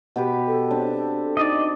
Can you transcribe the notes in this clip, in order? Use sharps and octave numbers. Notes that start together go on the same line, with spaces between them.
B2 G4 B4
A4
C4 D4
D#4 D5 D#5